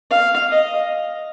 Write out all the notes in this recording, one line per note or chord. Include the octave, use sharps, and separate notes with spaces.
F5
D#5